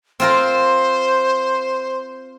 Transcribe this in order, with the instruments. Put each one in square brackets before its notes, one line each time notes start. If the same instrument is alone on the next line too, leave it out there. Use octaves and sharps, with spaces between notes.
[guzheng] C4 F4 A#4 [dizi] C5